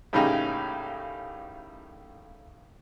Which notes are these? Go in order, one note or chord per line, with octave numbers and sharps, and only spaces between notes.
A2 C#3 G3 A#3 D#4 G#4